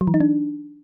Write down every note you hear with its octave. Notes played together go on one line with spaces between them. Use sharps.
F#3
E3
D#4
D4